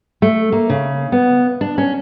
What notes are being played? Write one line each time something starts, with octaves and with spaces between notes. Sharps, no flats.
A3
A#3
C#3
B3
D4
C#4